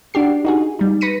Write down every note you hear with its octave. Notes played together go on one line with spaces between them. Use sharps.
D4 F#4 G4 C7
D#4 F#4 G#4
G3 D#4
B4 A#6 B6 C#7 D#7